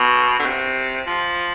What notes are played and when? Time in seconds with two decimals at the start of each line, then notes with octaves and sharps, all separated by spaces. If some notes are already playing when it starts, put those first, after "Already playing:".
Already playing: B2
0.39 D3
0.46 C3
1.07 F3